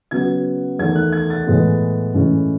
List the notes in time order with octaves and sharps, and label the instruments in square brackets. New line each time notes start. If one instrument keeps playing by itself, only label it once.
[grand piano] C#3 F#3 B3 G#6
E2 D#3 A3 G#6
F#6
G#6
A6
A2 E3 G#3 B3
A2 E3 G#3 C#4